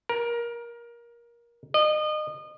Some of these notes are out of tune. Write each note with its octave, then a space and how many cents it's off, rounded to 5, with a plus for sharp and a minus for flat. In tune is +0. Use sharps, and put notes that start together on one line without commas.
A#4 +20
D#5 -30